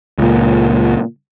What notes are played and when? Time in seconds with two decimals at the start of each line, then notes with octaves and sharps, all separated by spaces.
0.18 C#2 A#2